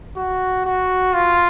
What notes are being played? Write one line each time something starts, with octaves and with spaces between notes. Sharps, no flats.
F#4
F#4
F4